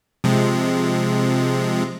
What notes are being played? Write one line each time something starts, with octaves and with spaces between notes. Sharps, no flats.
C3 F3 G#3